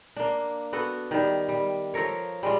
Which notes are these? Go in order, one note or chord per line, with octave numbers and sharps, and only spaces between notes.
A#3 D4
B3 F#4 A4
D#3 G3
G3
F3 A4 A#4 C#5
G3 G#3 F4